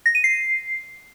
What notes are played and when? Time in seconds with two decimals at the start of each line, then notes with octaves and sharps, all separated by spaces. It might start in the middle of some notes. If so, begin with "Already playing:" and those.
0.06 A#6
0.15 D#7
0.24 C7